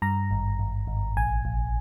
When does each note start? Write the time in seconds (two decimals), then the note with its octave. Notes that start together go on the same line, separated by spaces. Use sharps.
0.02 G2 A#5
0.31 G#1
0.59 G#1
0.87 G#1
1.17 A#1 G#5
1.45 A#1